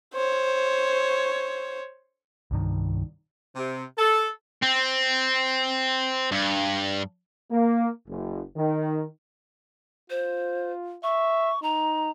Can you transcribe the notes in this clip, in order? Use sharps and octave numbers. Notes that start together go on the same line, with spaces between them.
C5 C#5
C2 G2 D#3
C3
A4
C4
G2
A#3
F#1
D#3
F4 C5
E5 C#6
D#4 A#5